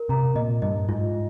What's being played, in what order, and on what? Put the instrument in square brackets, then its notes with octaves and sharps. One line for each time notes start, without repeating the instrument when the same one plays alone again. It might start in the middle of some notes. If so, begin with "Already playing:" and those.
Already playing: [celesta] A#4
[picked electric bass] C3 [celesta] A#5
[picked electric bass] A#2 [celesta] D#5
[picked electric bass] G2 [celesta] D#5
[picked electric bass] G#2 [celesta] F4